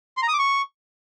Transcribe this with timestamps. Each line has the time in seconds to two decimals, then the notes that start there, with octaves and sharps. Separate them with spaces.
0.17 C6
0.23 A#5
0.28 D#6
0.33 D6
0.39 C#6